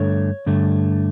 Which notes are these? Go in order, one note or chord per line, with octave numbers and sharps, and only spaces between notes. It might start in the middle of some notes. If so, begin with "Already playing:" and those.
Already playing: G2 D3 A3 C#5
G2 D3 A3